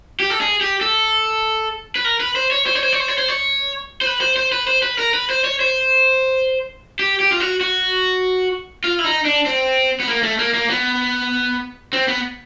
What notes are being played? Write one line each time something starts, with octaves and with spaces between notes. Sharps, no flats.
G4
A4
G#4
G4
A4
B4
A#4
B4
C5
C#5
C5
C#5
C5
C#5
C5
C#5
C5
C#5
C5
B4
C5
C5
B4
C5
B4
A#4
B4
C5
C#5
C5
G4
G4
F4
F#4
F#4
F4
E4
D#4
D4
C4
B3
A#3
A3
A#3
A#3
B3
C4
B3